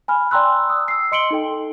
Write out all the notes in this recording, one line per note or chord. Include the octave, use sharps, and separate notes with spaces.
G#5 B5 F6
D5 G5 A#5 C6 E6 F#6
D#6 E6
E6 C7
D#5 C6 C#7 D7 F#7 G7
D#4 A4 G5